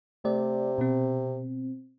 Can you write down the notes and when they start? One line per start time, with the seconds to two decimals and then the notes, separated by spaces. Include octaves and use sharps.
0.25 C3 A3 D5
0.78 B2 C4